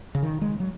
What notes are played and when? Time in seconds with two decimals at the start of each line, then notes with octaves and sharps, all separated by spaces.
0.15 C#3
0.23 D#3
0.41 G#3
0.60 F#3